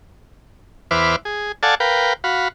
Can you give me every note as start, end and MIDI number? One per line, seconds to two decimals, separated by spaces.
0.91 1.16 40
0.91 1.16 71
0.91 1.16 72
0.91 1.16 76
0.91 1.16 86
0.91 1.16 89
1.25 1.52 68
1.63 1.75 69
1.63 1.75 74
1.63 1.75 77
1.63 1.75 78
1.63 1.75 80
1.63 1.75 81
1.80 2.13 70
1.80 2.13 71
1.80 2.13 77
1.80 2.13 79
2.24 2.48 66
2.24 2.48 77
2.24 2.48 83